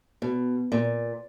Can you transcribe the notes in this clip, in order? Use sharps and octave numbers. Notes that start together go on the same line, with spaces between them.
B2
A#2